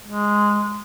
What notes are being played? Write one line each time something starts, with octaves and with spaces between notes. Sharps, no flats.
G#3